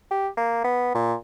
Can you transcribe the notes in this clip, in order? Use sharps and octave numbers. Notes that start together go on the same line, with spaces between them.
G4
A#3
B3
A#2